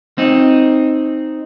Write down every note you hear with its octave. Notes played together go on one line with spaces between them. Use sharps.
C4 D#4